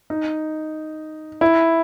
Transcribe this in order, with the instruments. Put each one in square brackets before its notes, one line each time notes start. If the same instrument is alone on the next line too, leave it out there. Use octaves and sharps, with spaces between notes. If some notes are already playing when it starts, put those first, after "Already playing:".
[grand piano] D#4
E4